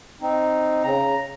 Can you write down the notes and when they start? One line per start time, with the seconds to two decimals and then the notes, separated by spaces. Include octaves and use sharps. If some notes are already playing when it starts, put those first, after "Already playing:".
0.21 C4 D#4
0.83 C#3 A#5